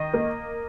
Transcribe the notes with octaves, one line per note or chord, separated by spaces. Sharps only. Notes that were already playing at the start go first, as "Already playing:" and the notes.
Already playing: D#3 D#5
A#3